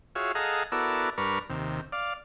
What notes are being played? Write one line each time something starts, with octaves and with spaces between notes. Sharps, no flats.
F4 F#4 G#4 C#5 E5
G#4 A4 D#5 F5 F#5 A#5
B3 E4 F#4 A4 A#4 D5
G2 D4 A#4 B4 C#6 F6
D#2 C3
D5 F5